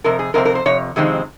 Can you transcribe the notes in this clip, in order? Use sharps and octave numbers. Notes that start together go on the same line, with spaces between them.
F2 C3 A#4
G#4
F2 C3 C4 A#4
A#4
C5
F2 C3 C#5
F2 C3 D#3 G#3 C4